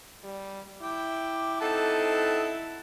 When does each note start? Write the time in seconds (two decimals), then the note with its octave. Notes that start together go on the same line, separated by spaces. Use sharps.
0.24 G3
0.82 E4 G5 D6
1.61 C4 D#4 A4 F#5 A5